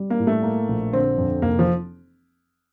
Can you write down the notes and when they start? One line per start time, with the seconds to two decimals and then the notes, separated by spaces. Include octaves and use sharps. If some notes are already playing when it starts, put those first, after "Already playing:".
Already playing: G3
0.10 A#3
0.19 A2
0.27 A3
0.43 A#3
0.69 A#1
0.93 D3 C4
1.18 F2
1.42 F1 A#3
1.59 F3